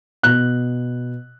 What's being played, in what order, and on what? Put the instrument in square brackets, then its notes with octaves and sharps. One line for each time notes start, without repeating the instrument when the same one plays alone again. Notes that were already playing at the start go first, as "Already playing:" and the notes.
[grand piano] B2 F#6